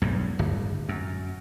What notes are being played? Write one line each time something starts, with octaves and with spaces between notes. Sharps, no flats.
B1 E2 G2
D1 G1
F#2